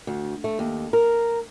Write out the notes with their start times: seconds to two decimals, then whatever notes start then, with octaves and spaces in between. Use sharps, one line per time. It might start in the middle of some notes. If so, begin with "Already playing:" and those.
0.07 D2
0.44 A3
0.59 D#2
0.93 A#4